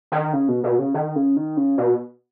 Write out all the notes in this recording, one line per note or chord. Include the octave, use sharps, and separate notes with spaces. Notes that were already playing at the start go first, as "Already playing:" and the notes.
D#3
C#3
B2
B2
C#3
D#3
C#3
D#3
C#3
B2